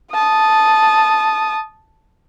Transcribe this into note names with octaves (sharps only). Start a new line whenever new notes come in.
A5 D#6